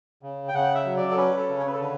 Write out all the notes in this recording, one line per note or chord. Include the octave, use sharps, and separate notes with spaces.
C#3
G5
C#3 F#5
E5
F#3
D5
A4
C#4 B4
A4
C#3
C#5
B4
A4
D3 B4